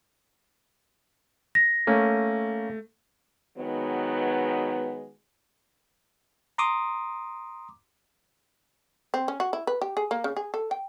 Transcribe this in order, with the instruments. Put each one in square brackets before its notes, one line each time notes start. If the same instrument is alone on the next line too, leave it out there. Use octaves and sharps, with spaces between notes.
[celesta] A#6
[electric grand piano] A3 [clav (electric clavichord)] A#3 C#4
[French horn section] D#3 F#3 G#3 B3
[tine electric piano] A#5 C6 D6 D#6
[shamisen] C4
C#4
F#4
E4
B4
G4
G#4
A#3
C#3
G#4
A4
G5